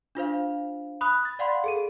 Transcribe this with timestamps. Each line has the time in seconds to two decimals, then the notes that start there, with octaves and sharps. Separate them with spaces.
0.15 D4 F4 C5 F5
1.01 B5 D#6 F#6
1.25 A6
1.39 D5 F5 F#5 B5 C6
1.64 G#4 A4 D#7